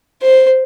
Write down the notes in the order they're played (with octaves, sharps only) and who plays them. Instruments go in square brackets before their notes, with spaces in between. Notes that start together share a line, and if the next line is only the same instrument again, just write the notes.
[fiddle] C5